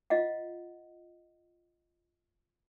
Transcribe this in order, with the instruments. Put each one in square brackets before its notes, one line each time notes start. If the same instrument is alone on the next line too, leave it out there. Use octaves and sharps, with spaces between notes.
[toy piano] F4 D#5 F5 F#5